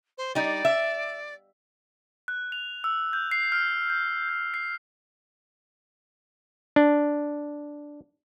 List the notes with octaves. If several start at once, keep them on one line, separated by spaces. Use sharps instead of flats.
C5
G3 D#4 D5
E5
F#6
F7
E6
G6
C7
F6
G6
G6
C7
D4